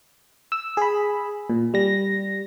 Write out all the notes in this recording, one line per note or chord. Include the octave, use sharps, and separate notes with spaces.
E6
G#4 B5
A#2
G3 A#6